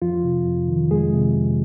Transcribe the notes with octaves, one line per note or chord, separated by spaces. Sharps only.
F2 F3 F4
C3
F2
D#3
F2 G#3 G#4
C3
F2